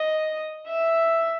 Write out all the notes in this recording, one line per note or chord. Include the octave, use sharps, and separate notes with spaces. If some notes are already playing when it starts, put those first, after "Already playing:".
Already playing: D#5
E5